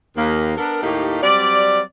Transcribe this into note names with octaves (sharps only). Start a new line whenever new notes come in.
D#2 A#3
B3 D4 A4 A#4
D#2 A2 A3 A#3 D#4 G4
F#3 G3 C4 D5